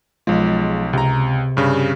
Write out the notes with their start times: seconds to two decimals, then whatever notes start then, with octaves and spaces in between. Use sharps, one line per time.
0.27 B1 F3 G#3
0.93 C#2 C3 A#5
1.57 G2 C#3